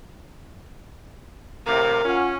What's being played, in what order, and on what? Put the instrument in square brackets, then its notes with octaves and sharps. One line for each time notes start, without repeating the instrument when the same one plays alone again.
[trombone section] A2 C3 [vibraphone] A#4 A#5 D6 [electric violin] F5
[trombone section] C#4 [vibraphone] F4 F#5